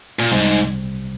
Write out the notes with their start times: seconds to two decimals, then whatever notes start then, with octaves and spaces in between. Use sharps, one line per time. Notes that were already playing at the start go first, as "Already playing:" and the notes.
0.19 A#2
0.31 C2 G#2 C3 G3 C4